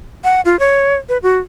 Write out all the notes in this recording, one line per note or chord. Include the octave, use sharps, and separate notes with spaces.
F#5
F4
C#5
B4
F#4